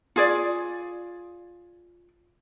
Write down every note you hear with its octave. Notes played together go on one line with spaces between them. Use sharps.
F4 G#4 D5